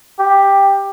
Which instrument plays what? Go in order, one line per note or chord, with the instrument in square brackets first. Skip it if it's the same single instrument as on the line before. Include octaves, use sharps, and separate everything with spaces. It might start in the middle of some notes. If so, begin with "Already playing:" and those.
[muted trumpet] G4